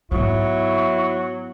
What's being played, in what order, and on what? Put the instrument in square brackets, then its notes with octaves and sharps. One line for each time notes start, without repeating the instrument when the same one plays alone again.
[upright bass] G#2 B3 [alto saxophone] F#3 [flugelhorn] E4 [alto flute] C#6